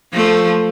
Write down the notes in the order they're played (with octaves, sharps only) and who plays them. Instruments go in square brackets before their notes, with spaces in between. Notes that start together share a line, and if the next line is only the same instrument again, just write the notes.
[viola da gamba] F3 A3